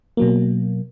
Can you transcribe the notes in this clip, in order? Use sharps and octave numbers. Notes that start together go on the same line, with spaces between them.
B2 F#3 A#3